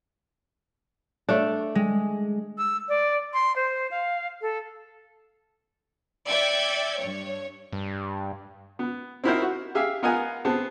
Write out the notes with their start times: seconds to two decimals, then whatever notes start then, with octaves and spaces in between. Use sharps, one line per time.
1.29 A3 D4
1.75 G#3
2.58 E6
2.89 D5
3.33 C6
3.56 C5
3.91 F5
4.41 A4
6.27 D5 E5 G5 G6 G#6 C#7
6.97 G2 C#5
7.73 G2
8.79 B3
9.24 C4 D#4 E4 F#4 A#4 C5
9.42 F#4
9.75 G4 G#4 E5 F5
10.03 B3 F4 A#4 D#5 F#5 G#5
10.45 B3 C4 G#4 A5